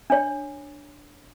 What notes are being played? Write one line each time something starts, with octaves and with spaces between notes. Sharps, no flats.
D4 C#5